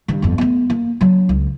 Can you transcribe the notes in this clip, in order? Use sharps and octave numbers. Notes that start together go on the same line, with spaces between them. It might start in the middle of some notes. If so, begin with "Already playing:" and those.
G2 D#3
G1 F2
A3 B3
A#3
F#3 D4
C#2